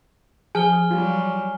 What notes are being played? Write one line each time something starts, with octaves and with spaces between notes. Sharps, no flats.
F3 G#4 G#5 F6 G7
F#3 G3 F4 G4